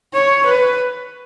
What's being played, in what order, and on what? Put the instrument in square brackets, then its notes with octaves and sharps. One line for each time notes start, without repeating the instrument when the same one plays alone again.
[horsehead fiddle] C#5
B4